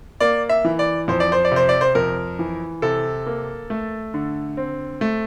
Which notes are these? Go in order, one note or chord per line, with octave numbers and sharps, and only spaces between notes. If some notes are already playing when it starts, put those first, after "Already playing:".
A#3 D5
E5
E3
D5
F2 C5
D5
C5
D5
C3 C5
D5
C5
F2 A#4
E3
C3 A4
A#3
A3
D3
C4
A3